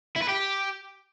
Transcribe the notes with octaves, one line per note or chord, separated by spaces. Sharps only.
E4
B4
G4